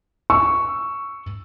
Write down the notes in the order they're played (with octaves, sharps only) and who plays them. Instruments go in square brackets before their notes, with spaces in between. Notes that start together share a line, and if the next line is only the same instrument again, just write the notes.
[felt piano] C#6 E6